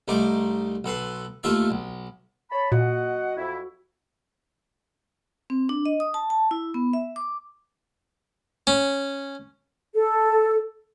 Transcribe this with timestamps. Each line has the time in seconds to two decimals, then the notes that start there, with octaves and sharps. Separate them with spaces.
0.08 C2 A3 D#4 C5 D6
0.84 B1 A4 B4 C6
1.44 D#2 A3 F4 E5 A5
1.71 B1
2.51 C#5 A5 B5
2.72 A#2 F#4 D#5 F#5
3.37 F2 E4
5.50 C4
5.69 D4
5.85 D#5
6.00 D#6
6.14 A5
6.30 A5
6.51 E4
6.74 B3
6.93 E5
7.16 D6
8.67 C#4
9.94 A4